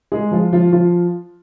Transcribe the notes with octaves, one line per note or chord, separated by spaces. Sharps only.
G#3 G#4
F3 F4
F3 F4
F3 F4